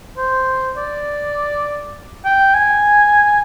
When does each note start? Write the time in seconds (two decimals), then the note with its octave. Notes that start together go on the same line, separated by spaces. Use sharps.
0.18 C5
0.77 D5
2.25 G5
2.54 G#5